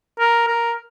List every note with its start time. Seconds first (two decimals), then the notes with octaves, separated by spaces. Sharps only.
0.19 A#4
0.47 A#4